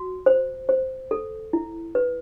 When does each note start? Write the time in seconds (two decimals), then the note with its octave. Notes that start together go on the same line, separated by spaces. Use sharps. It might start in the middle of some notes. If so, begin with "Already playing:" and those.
Already playing: F#4
0.26 C5
0.69 C5
1.11 A4
1.53 E4
1.95 B4